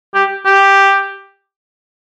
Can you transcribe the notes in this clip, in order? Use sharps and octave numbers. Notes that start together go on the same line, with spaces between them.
G4
G4